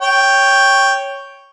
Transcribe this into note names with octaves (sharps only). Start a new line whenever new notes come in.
C#5 G5